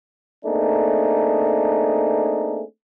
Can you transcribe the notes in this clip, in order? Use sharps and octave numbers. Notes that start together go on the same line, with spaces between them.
A3 A#3 C4 D4 D#4 G#4